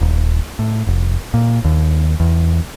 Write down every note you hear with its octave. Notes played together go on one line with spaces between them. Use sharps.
D#1
A2
F1
A#2
D#2
E2